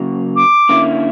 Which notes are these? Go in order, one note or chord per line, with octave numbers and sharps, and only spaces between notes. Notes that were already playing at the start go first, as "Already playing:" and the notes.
Already playing: C#3 F#3 A#3
D6
D3 A#3 C#4 E4